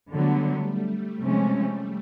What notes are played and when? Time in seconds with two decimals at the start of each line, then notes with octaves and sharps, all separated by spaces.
0.12 D3 F#3 G3 A3 B3
0.66 G3 A3
1.21 C3 F3 G#3 C#4